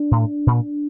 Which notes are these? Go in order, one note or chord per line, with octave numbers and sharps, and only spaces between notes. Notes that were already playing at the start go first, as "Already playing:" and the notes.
Already playing: D4
A2
A#2